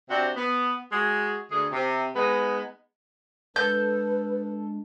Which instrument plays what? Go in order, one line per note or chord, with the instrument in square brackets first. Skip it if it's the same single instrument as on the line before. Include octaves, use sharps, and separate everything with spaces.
[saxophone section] C3 C4 D4 F#4
B3
G#3 F#4 G#4
D2 G#4
C3
G#3 B3 D#4 B4
[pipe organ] G#3 D4 [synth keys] A4 [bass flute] B4 [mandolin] G6